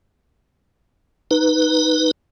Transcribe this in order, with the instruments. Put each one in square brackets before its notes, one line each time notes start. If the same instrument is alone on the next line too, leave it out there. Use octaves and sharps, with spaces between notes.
[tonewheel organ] D#4 B4